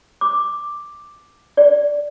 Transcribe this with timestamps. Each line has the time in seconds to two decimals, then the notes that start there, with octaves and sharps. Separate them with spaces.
0.21 D6
1.57 D5